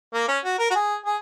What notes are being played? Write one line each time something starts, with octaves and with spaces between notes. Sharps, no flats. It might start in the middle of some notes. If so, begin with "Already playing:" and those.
A#3
C#4
F#4
A#4
F#4
G#4
G#4